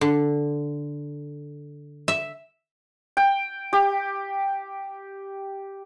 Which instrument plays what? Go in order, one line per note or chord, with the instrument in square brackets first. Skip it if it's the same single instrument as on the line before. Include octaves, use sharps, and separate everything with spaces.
[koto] D3
E5
[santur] G5
G4